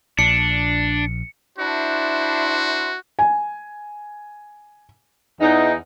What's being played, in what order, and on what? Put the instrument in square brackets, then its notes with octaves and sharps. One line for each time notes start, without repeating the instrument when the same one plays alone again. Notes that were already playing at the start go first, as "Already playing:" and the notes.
[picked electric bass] A#1 [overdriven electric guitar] D4 [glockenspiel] C#7
[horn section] D4 E4 C5 [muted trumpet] F#4
[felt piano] G#5
[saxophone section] E2 D#4